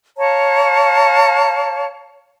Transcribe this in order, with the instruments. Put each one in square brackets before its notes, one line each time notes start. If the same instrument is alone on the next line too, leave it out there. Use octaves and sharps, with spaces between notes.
[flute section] C#5 F5 A5 A#5